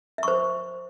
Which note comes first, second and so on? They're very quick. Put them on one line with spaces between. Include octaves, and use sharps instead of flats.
E5 C#6 C5